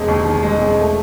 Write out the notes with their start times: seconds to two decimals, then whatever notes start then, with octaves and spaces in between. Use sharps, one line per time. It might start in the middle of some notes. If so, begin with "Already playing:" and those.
Already playing: E1 G#3
0.08 D#2
0.25 D#3
0.43 G#3
0.61 E1
0.79 A3